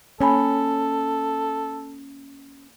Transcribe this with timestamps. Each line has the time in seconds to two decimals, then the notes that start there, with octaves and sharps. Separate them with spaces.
0.21 A#3 C#4 A4 G#5 B5